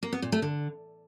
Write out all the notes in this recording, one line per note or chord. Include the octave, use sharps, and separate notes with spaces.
A#3
B3
A#2
A3
D3